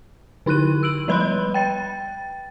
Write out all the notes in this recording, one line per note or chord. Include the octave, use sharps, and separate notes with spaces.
D3 D#4 E4 F#6 D#7
E6 D7 F#7
F3 G3 B4 B5 C6 F#6
G5 A6